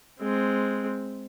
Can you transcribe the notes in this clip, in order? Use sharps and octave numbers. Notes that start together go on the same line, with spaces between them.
G#3 C4